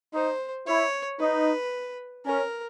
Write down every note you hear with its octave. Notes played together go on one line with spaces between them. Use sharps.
D#4 C5
E4 C#5
D#4 B4
C#4 A#4